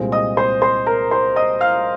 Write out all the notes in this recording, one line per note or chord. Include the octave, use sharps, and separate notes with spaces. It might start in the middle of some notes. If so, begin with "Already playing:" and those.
Already playing: C2 A#2 G#3 C4
D#5 D#6
C5 C6
C5 C6
A#4 A#5
C5 C6
D#5 D#6
F5 F6